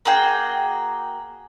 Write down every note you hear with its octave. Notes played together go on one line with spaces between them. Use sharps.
A#3 F#4 G#4 G5